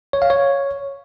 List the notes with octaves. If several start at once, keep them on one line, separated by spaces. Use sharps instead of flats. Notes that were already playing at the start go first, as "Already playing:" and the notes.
C#5
F5
C#5